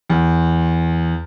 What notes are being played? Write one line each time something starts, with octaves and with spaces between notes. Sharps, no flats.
E2